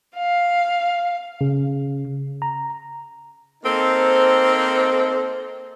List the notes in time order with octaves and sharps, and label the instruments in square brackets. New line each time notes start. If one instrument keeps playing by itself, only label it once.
[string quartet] F5
[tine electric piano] C#3
A#5
[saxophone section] A#3 C4 D#4 A4 C5